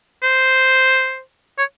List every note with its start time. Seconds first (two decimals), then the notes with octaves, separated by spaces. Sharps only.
0.23 C5
1.59 C#5